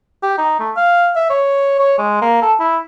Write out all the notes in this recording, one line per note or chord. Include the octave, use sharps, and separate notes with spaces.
G4
D#4
A3
F5
E5
C#5
C#5
G#3
A#3
A4
E4